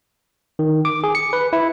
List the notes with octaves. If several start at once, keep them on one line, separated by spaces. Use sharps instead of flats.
D#3
D6
G#4
C#7
B4
E4